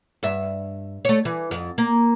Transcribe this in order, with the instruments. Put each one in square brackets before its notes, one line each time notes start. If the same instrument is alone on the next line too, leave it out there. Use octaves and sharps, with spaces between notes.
[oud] G2 E5
A3 C#5
E3
F2
A#3